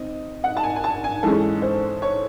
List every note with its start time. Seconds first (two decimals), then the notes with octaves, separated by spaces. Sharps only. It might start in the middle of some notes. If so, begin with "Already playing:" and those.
Already playing: C4 D#4 D#5
0.44 F#5
0.57 A5
0.63 G#5
0.76 G#5
0.84 A5
1.04 G#5
1.23 G#2 E3 G#3 C#4 A4
1.62 C5
2.02 C#5